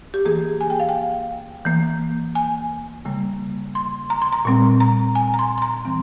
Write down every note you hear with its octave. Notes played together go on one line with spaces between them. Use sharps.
G4
E3 A#3 G#4
G#5
G5
F5
G5
E3 A#3
G#5
C#3 G3 A#3
C6
A#5
C6
A#5
A#2 G3 C4
A#5
G#5
A#5
C6
C6
A#5
E3 G3 C4